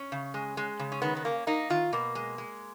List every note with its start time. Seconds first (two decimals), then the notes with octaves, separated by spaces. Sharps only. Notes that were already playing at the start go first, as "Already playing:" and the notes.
Already playing: C#4
0.12 C#3
0.34 G#3
0.57 G#3
0.79 C#3
0.92 C#4
1.02 D#3 B3
1.17 B3
1.25 A#3 C#4
1.47 A#3 D#4
1.70 D#3 F4
1.93 B2 A#3
2.15 G#3
2.38 G#3